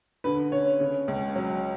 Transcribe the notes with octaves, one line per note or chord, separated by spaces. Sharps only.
D3 B4
C#4 C#5
C#3
C#2
F#3